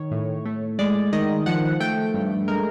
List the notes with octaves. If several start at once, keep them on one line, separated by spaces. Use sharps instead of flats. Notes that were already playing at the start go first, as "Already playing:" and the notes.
Already playing: D#3 C#5
A2
A3
G#3 D5
D#3 D#5
F3 F#5
A3 G5
G2
G#3 A#4